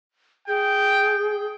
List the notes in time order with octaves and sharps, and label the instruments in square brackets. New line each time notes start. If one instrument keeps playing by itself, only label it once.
[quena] G#4 [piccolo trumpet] G5